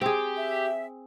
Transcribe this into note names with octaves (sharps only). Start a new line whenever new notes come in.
C4 G4 G#4
E5